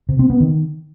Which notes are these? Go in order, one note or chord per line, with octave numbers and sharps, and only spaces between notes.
C3
C4
B3
D#3